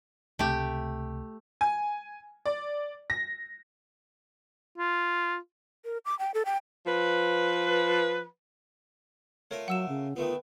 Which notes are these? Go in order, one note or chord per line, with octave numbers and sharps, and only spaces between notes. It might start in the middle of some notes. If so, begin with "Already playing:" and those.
C#2 C3 A3 G4
G#5
D5
A#6
F4
A#4
D6
G5
A4
G5
F3 B4
A3 F4 A#4 C#5
F#3 F#5 E6 E7
C#3
D#3 A3 B3 F4